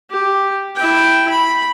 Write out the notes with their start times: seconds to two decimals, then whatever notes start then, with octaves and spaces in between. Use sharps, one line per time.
0.11 G4
0.76 E4 G5
1.30 B5